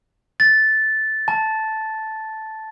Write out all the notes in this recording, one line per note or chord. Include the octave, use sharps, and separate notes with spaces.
A6
A5